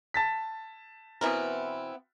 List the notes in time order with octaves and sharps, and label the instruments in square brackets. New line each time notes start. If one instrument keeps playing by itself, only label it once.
[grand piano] A5 A6 B6
[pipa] B2 E3 A#4 [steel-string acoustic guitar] B3 C4 E4